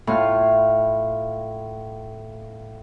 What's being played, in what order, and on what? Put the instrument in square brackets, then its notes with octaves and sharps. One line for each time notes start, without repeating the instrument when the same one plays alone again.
[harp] A2 F4 F6